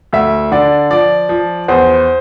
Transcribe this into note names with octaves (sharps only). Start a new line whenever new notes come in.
D2 E5
D3 D5
F3 D5
F3
E2 C5